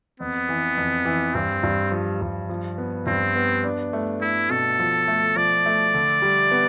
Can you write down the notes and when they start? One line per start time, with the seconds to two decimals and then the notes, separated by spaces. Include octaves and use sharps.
0.20 F2 B3
0.49 E3
0.78 F2
1.05 E3
1.35 G2 C4
1.63 G2
1.92 F3
2.21 G2
2.49 F3
2.78 B3
3.07 G2 C4
3.36 B3
3.64 D4
3.93 A3
4.22 A3 E4
4.50 B2 A4
4.79 F3
5.08 A3
5.36 F3 D5
5.66 A3
5.94 D3
6.22 G3
6.51 B3